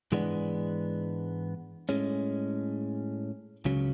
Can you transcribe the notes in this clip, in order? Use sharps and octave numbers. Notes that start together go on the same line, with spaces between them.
G#2 E3 G#3 B3 D4
A2 G#3 C#4
C#2 C#3 F#3